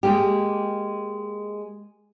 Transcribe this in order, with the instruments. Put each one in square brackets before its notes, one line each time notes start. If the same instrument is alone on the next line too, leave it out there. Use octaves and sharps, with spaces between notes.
[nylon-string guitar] G#3 A#3 G4